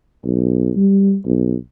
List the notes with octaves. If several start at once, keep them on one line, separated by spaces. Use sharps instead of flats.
B1
G3
B1